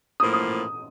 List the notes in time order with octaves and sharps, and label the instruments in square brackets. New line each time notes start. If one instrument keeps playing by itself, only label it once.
[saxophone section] A2 F3 A#3 [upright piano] D#6
[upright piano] D#6